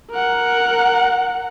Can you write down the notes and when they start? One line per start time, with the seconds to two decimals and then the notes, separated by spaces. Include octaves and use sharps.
0.11 A#4 F#5